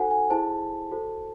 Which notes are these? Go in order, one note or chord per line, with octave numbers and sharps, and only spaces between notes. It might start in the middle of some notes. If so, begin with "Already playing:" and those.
Already playing: D#4 F#4 A4 C5 F#5 G#5
G#5
E4 G#4 C5 A5
F#4 A4 C5